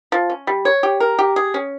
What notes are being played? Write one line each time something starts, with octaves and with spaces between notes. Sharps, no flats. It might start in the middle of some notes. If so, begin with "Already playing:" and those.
F3
C#4
G3
C#5
G4
A#4
G4
G#4
C#4